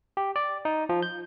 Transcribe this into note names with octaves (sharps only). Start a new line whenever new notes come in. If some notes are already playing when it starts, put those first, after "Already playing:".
G4
D5
D#4
F3
G6